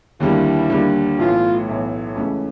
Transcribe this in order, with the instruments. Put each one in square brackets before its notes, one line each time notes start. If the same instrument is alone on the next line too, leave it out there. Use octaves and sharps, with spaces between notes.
[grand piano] D#2 D3 G3 A#3 [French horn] E4
[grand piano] D#2 D3 G3 A#3
[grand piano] B1 A2 E3 A3 [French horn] F4
[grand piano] B1 A2 E3 A3
C#2 C#3 E3 A3 C#4